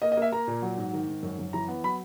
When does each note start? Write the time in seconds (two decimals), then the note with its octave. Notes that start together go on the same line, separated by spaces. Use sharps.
0.02 A#3 D#5
0.12 D#5
0.17 A#3 E5
0.32 A#3 A#5
0.47 A#2
0.62 F#3
0.77 G#2
0.93 D#3
1.08 G#2
1.23 F#2
1.39 F#2
1.53 E3 A#5
1.68 B3
1.84 F#3 B5